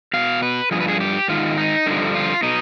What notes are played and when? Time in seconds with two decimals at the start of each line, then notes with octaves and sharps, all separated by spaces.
0.14 B2 F5
0.42 B4
0.71 G2 F3 G#4
0.80 B4
0.88 G#4
1.00 G4
1.28 G#2 D#3 F4
1.58 D#4
1.86 G2 D3 F3
2.15 F4
2.43 B2 D#4